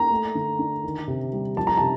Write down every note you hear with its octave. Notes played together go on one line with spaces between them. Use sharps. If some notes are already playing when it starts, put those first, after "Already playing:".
Already playing: A#3 A#5
A3
D3
D4
D#3
C3
G3
F3 A5
A#5
C3 A5